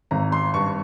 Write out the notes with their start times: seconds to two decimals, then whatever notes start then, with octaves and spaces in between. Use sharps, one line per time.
0.11 G#1 A#5
0.32 C6
0.54 G2 C#6